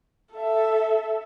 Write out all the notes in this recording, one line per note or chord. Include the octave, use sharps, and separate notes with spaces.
A4 E5